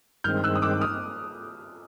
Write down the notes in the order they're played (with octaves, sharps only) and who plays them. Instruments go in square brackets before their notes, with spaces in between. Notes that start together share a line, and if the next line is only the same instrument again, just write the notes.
[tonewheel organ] G2 D#3 G#3 C4 [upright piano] F6 G6
[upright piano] E6 F#6
D#6
D6 E6
D#6 F6